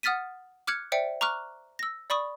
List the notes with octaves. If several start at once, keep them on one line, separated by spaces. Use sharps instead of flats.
F#5 D#6 F6 A6 B6 D#7
D6 F6 F#6 G#6 C#7
C5 D5 E5 G5 C#7
A#5 C#6 D6 F6 F#6
E6 A#6
D5 B5 C#6 D#6